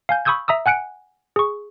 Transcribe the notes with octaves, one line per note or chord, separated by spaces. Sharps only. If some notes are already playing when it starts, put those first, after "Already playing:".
F5 G#5 G6
B5 C#6 D#6 E6 G6 G#6
E5 A#5 D#6 E6
F#5 G#5 F#6 C#7 D7
G#4 C#6